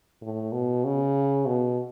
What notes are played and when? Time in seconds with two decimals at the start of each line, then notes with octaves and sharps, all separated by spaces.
0.21 A2
0.52 B2
0.84 C#3
1.46 B2